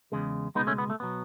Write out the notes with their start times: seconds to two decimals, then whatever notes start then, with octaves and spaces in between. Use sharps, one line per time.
0.12 E2 C#3 G#3
0.55 C#2 B2 G#3 B3 D#4
0.67 A3 C#4
0.78 B3
0.90 A3
1.00 B2 F#3 B3